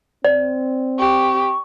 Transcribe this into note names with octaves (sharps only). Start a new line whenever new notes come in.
C4 D5
G4 C#6